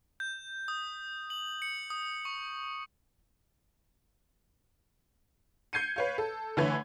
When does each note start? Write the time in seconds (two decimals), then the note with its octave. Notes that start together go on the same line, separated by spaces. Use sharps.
0.20 G6
0.68 D#6
1.30 F#7
1.62 C#7
1.90 D#6
2.25 C#6
5.73 G6 G#6 C7 C#7 D#7
5.96 B4 C#5 F5
6.18 A4
6.57 D3 E3 A3 B4 C#5 G#6